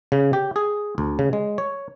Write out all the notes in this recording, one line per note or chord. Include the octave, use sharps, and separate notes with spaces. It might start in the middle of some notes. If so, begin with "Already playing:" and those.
C#3
G4
G#4
D2
C#3
G#3
C#5